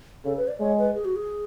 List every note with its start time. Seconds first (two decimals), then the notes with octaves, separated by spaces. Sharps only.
0.25 C#3 A4
0.37 B4
0.48 D5
0.60 G#3 C#5
0.78 B4
0.95 G#4
1.05 F#4
1.16 G#4